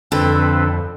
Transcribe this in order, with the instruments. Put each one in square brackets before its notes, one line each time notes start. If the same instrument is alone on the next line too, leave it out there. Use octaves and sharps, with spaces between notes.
[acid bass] F2 [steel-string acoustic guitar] D3 [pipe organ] C4 A4 B4